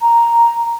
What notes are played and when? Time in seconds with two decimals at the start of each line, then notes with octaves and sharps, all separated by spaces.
0.01 A#5